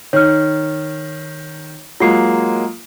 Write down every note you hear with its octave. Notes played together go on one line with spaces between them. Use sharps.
D#3 C#5 F6
F#3 G#3 A#3 F4 C7